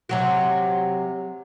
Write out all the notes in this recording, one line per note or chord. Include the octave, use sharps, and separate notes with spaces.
C3 F#3 F#4